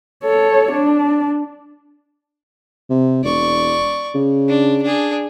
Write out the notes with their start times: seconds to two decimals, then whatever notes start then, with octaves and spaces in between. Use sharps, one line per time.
0.24 A4 C#5
0.72 D4
2.90 C3
3.24 E1 D5 C#6
4.15 C#3
4.48 D4
4.82 D4 G#4